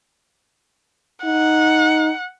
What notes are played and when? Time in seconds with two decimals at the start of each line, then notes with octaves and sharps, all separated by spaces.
1.25 D#4 F#5